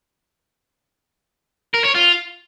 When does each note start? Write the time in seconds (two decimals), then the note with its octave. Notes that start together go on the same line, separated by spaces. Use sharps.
1.74 A#4
1.84 C#5
1.95 F4